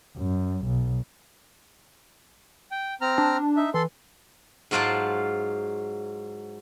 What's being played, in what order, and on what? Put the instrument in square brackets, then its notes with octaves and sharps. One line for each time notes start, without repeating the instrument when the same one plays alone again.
[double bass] F#2
B1
[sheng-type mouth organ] G5
C4 A#5 F6
[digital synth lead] D4
[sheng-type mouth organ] D#4 E5
[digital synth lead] E3 [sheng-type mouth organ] A4 C6
[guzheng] G#2 F#3 F4 C5 D5 A5